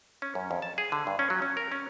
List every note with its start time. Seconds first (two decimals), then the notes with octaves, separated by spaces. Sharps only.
0.22 C#4
0.35 F#2
0.51 F2
0.62 A5
0.78 G#4
0.92 D3
1.07 G2
1.19 C#4
1.30 F#3
1.42 C#4
1.57 A#4
1.72 C#4